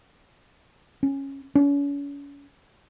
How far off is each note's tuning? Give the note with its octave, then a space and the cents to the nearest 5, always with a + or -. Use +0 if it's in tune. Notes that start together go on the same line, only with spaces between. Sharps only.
C#4 -10
C#4 +40